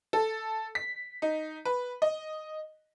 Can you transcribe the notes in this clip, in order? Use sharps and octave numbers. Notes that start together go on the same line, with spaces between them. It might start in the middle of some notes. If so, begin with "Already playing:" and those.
A4
B6
D#4
B4
D#5